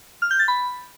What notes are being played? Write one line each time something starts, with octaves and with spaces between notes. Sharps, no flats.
F6
G6
A6
B5